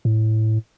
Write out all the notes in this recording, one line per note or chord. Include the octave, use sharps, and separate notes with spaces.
A2